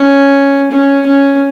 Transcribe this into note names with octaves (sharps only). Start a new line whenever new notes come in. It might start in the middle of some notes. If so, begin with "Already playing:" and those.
Already playing: C#4
C#4
C#4